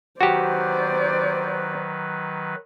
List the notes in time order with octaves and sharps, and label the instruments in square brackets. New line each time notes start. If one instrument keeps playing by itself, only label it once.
[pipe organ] D#3 F#3 B4 [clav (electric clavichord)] F#4 G4 [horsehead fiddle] C5 D5